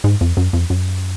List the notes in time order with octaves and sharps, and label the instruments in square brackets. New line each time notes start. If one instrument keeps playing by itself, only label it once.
[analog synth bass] G#2
F2
F#2
F2
F#2